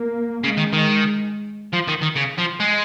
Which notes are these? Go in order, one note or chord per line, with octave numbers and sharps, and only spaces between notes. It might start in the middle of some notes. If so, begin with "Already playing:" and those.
Already playing: A#3
C#3 G#3
D#3
D#3
F3
D#3
D#3
C#3
F3
G#3